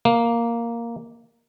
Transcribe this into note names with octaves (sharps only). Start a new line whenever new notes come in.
A#3